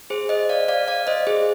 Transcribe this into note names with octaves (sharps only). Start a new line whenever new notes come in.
G#4 C5
C5 D#5
D5 F5
D5 F5
D5 F5
C5 D#5
G#4 C5